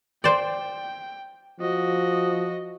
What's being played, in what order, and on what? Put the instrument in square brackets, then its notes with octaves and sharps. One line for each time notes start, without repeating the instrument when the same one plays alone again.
[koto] C5 D5 [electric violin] G5
[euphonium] F3 [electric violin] F#4 D#5